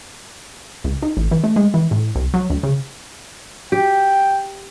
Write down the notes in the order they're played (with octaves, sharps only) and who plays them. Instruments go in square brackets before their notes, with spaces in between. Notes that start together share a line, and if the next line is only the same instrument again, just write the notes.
[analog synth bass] C#2
D#4
A1
E3
A3
G#3
E3
A2
C2
F#3
D2
C#3
[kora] G4 [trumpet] G5